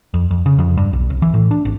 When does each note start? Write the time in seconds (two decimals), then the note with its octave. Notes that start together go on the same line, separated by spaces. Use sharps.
0.14 F2
0.31 F2
0.46 C#3
0.59 F2
0.77 G2
0.93 B1
1.10 C2
1.22 E3
1.34 A2
1.51 D4
1.65 G#1